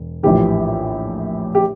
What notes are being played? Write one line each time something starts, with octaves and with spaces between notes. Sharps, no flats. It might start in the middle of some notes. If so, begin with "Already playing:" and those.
Already playing: E1
A#1 A2 E3 G4
G4